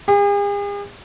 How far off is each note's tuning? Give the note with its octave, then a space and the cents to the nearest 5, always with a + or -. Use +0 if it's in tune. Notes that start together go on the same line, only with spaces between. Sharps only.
G#4 -45